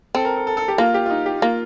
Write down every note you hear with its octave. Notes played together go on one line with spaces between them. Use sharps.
C4 A4
A#4
A4
A4
A4
G4
A#3 F4
G4
F4
D#4
G4
A#3 F4